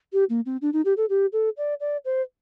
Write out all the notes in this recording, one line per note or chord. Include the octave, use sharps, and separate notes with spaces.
G4
A#3
C4
D4
D#4
G4
A4
G4
A4
D5
D5
C5